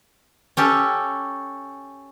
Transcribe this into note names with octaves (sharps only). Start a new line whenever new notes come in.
C#4 G4 A4